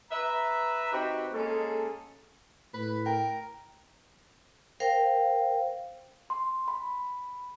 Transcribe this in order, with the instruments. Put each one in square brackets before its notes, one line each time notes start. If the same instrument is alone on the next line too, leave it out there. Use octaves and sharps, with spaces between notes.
[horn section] B4 E5 A#5
C4 D#4 F#4 G4 B4
G#3 A#3 C#4 G#4 A4
[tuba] A2 [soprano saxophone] B4
[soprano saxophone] A#4 [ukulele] G5
[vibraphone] A#4 C5 F5 G5
[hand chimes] C6
B5